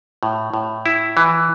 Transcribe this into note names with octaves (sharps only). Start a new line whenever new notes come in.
A2
A2
E4
E3